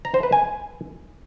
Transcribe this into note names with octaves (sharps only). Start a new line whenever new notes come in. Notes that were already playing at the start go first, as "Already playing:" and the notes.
A#5
C5
B4
G#5